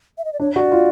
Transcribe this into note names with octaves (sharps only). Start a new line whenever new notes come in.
E5
D#5
D5
D4 C#5
F#4 D5
F4